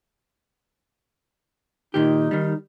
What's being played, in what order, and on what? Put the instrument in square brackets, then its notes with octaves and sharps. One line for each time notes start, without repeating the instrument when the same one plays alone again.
[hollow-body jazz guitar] A#2 D#3 G4 [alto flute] D#4
[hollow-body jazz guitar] D#3 G3